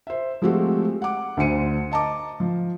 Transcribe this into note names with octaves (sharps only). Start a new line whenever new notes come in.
C5 E5
F3 G#3 A3 C4 F#4 G4
F#5 D6
D2 D3 C5 C#7 D#7
D#5 A5 A#5 D6
F3